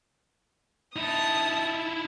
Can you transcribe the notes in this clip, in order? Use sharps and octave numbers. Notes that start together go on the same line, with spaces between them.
D#4 E4 A5 D#6